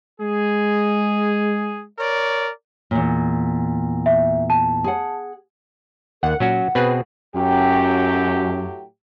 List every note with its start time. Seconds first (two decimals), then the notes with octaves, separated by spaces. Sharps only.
0.21 G#3 G#4
1.99 A#4 C#5 D5
2.91 E2 A#2
4.06 E5
4.50 A5
4.84 G#4 F#5
6.23 D#2 A#4 F#5
6.40 A#2 F#3 C#4 F#4 F#5
6.75 B2 C4 G#4 B4
7.35 F#2 A2 F#3 G4